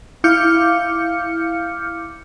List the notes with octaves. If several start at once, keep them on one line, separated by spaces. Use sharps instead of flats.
E4 F5 D6 F6 G6 C#7